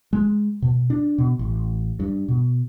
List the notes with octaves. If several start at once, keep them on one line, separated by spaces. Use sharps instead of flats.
G#3
B2
D4
B2
A1
G2
B2